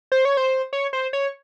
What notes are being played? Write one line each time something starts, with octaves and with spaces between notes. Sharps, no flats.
C5
C#5
C5
C#5
C5
C#5